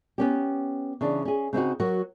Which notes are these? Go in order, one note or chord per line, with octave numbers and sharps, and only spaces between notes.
B3 C#4 G4
C#3 E3 D4
C#4 G#4
C#3 C4 D#4 F#4
F#3 F#4 A#4